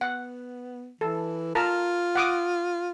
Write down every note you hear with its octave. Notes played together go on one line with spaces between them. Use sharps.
B3 F#5
E3 A4
F4 A#4 A5
F#5 D6 D#6